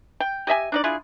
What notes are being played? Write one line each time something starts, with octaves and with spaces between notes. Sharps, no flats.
G5
G4 D#5 E5 G#5
D4 D#4 D5
D4 E4 F4 G#4